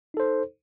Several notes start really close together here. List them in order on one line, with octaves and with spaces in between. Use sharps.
D#4 A4 C5